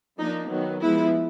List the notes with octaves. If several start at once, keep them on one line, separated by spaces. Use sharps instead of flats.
F3 A#3 D4 D#4
D#3 F#3 B3
F3 G#3 B3 E4